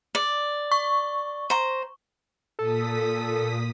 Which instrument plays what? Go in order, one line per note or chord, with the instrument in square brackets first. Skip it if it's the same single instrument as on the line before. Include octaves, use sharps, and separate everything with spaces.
[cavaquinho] D5
[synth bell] C#6
[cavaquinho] C5 A#5
[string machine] A#2 D#6 B6 [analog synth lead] A4